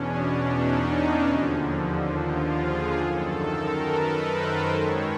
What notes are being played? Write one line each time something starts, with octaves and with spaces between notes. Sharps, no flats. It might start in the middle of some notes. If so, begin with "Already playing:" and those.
Already playing: E2 B2 C#4 D4
D4
D#4
D#2 D3 F3
F4
G#4
F#2 D#3 A4
A#4
B4
C5
G#2 D#3 C#5